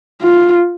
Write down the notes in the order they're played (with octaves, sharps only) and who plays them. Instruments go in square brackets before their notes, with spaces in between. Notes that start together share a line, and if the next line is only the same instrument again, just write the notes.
[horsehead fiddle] F4